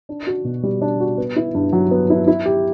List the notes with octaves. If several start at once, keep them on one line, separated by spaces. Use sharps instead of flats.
D4
F#4
B2
G3
D4
F#4
B3
E4
G2
F#3
B3
E4
E4
G4